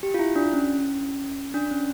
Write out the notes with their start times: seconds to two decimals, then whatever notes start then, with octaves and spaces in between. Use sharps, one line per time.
0.03 G4
0.14 F4
0.19 E4
0.36 D4
0.53 C#4
1.54 D4
1.71 C#4